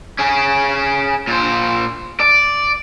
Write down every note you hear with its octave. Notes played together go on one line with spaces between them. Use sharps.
C#4 G#4
A#2 C5
D5